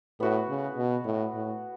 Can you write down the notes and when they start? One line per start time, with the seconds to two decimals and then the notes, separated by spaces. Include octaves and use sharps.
0.20 A2 B3 F#4 B4
0.49 C#3
0.77 B2
1.05 A2
1.34 A2